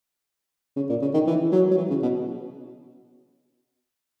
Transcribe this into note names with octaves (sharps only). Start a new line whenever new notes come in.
C#3
A#2
C#3
D#3
E3
F#3
F#3
E3
C#3
B2